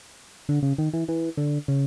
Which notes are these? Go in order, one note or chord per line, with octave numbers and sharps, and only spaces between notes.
D3
C#3
D#3
E3
E3
D3
C#3